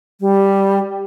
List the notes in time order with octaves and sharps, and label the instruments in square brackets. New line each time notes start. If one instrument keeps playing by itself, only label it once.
[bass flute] G3